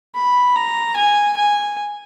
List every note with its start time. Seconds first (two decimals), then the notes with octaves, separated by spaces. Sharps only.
0.15 B5
0.56 A#5
0.97 G#5
1.37 G#5